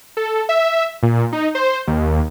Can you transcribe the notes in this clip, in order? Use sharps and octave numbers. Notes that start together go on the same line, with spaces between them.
A4
E5
A#2
D#4
C5
D#2